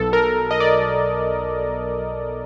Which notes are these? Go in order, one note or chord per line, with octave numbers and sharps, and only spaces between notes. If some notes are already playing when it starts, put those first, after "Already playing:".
Already playing: B1 B2 A4
A#4
D#5
D5